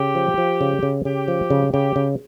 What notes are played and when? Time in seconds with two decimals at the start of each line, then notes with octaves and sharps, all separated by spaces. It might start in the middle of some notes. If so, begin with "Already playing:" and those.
Already playing: C#3 G4
0.15 F3
0.38 F3
0.61 C#3
0.83 C#3
1.05 C#3 G4
1.28 F3
1.50 C#3
1.73 C#3 G4
1.96 C#3